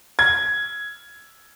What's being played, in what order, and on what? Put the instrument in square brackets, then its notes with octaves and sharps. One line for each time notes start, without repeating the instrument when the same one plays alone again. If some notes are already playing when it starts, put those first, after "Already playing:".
[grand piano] G#6